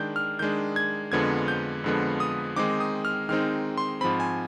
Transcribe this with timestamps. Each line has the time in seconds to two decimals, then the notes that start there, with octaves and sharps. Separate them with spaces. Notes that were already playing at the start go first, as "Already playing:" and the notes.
Already playing: D#3 G#3 D4 G6
0.16 F6
0.39 D#3 G#3 D4 G6
0.76 G#6
1.12 F2 D3 F3 G#3 B3 G#6
1.48 G6
1.84 F2 D3 F3 G#3 B3
2.20 D#6
2.56 D#3 G#3 C4 D#4 D6
2.80 D#6
3.05 F6
3.29 D#3 G#3 C4 D#4 F6
3.78 C6
4.01 G#2 F3 C4 B5
4.20 G#5